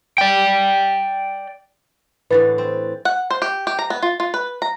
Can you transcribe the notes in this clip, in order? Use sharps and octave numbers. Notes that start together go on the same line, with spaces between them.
D5 G5
A2 D3 E3 B4 A6
C4
F#5
C5
G4
G4
A#5
B3
F4
F4
B4
A#5